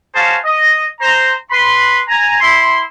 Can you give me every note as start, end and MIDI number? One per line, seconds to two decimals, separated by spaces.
0.15 0.38 61
0.15 0.38 66
0.15 0.38 68
0.15 0.38 72
0.15 0.38 77
0.15 0.38 81
0.44 0.85 75
1.01 1.34 72
1.01 1.34 82
1.51 1.99 71
1.51 1.99 83
1.51 1.99 84
2.08 2.36 80
2.08 2.36 82
2.41 2.80 64
2.41 2.80 84